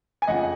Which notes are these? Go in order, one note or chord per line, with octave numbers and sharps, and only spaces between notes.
G#5
F2 C#3 F3 D#5 F#5